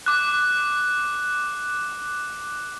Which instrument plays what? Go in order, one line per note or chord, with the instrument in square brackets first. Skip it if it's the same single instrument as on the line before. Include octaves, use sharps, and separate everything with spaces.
[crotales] D6 F#6